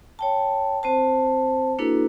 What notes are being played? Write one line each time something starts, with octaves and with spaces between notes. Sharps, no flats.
C#5 G5 A5
C4 C5 A5
A#3 D4 E4 F#4 A4 B4